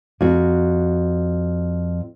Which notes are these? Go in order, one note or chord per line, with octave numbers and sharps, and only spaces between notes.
F2 F#4